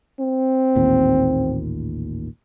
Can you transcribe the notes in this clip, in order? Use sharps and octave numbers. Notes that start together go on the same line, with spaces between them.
C4
A1 D#2 A#2